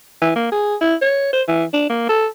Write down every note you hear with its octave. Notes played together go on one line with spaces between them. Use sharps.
E3
A#3
G#4
E4
C#5
C5
E3
D4
A#3
A4